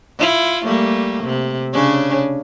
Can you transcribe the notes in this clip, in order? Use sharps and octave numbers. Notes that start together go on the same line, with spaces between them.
E4 F4
G3 A3 A#3
C3
C#3 C#4 D4